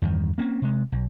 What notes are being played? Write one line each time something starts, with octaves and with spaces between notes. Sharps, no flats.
E2 G2 D#3
A#3 C4 C#4
C3 G#3
B1